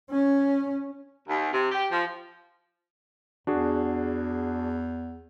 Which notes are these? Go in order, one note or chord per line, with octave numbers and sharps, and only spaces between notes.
C#4
D#2
C3
G4
F3
E2 D4 F#4 G#4